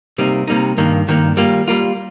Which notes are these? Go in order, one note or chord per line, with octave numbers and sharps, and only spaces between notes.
C3 G3 A#3 D#4
C3 G3 A#3 D#4
G2 D#3 A#3
G2 D#3 A#3
G3 A#3 F4
G3 A#3 F4